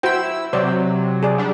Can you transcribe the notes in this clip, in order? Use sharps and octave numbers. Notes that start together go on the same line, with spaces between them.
E4 F#4 C5 G5 E6
C3 F#3 C5 D5
G#4 D5
G3 D4